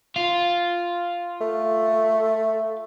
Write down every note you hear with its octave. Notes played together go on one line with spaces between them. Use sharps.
F4
A3